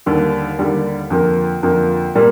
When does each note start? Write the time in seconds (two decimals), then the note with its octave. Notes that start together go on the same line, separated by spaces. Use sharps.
0.06 D#2 D3 G3
0.59 D#2 D3 G3
1.10 F2 D3 F3 A#3
1.63 F2 D3 F3 A#3
2.15 A#2 G3 A#3